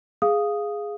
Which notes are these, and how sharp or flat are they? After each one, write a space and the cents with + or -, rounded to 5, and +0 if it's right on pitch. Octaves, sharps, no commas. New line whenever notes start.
G#4 +0 F5 +0 D#6 +0